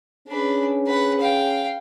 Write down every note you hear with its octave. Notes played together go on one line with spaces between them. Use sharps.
C#4 D4 G#4 B4
B4 F#5
F5 G5